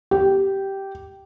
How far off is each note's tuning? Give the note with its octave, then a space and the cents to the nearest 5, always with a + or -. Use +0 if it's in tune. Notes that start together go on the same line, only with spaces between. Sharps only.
G4 -10